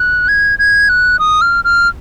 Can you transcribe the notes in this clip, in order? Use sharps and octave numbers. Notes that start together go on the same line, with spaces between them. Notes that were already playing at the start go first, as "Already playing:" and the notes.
Already playing: F#6
G#6
G#6
F#6
D#6
F6
F6